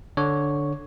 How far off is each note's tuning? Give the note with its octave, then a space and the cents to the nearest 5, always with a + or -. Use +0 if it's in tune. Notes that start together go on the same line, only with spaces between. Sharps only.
D3 +0 C#5 +0